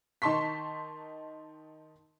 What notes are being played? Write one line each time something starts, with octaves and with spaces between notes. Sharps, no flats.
D#3 D#4 A5 C6 C#6 B6